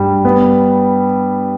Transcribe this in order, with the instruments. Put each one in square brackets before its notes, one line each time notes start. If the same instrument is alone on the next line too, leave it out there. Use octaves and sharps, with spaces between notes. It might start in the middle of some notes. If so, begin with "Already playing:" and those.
Already playing: [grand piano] G2 G3
B3